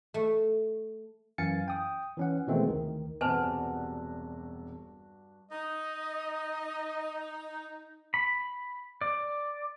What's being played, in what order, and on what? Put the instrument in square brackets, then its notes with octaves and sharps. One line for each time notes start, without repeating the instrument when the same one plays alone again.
[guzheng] A3
[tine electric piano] F#2 E3 F5 G#5 A6 C#7
G5 D#6
E3 C#4 F#5
B2 D#3 E3 G#3 A3 C4
D2 D#3
[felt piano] E1 C3 [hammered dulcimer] G2 F#4 [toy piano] B4 C5 G#5 [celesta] A5
[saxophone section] D#4 [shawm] D#5
[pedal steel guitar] B5
D5